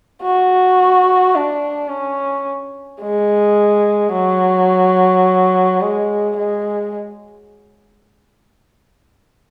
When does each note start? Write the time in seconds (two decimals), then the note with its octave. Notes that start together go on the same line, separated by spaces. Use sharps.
0.23 F#4
1.35 D4
1.90 C#4
3.02 G#3
4.13 F#3
5.81 G#3
6.37 G#3